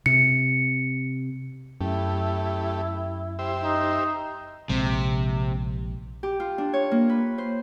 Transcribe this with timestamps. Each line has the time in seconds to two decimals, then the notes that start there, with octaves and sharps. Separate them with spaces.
0.06 C3 C#7
1.81 F#2 A3 E4 G4
3.39 G4 C5 E5
3.64 D#4
4.69 A#1 C3 G#3
6.23 G4
6.40 F4
6.58 D4
6.73 C#5
6.91 A#3
7.09 B4
7.38 C5